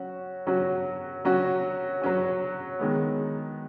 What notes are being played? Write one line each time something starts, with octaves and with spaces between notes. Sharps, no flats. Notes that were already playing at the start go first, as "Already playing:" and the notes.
Already playing: F#3 C#4 F#4
F#3 C#4 F#4
F#3 C#4 F#4
F#3 C#4 F#4
D#3 G#3 B3